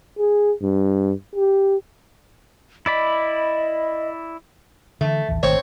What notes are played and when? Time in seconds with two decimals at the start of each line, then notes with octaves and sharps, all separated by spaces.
0.18 G#4
0.61 G2
1.35 G4
2.86 E4 D5 D#5 B5
5.01 D3 E3 A3
5.29 A1 D#2 E3
5.43 G#1 D#3 A3 C4 C5 C#5